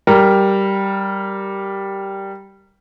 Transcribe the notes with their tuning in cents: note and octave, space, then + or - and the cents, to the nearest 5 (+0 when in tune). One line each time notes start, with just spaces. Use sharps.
G3 -5 A#4 +0